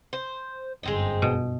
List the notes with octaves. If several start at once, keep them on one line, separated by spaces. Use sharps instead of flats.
C5
G1 F#2 G#3 C4 D#4
B2